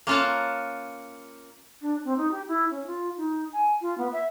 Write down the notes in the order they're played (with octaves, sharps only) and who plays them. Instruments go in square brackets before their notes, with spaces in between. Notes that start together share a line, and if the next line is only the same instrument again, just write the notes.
[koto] A#3 C#4 F4 F#5 A5
[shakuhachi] D4
C4
D#4
G4
E4
C#4
F4
D#4
G#5
F4
B3
E5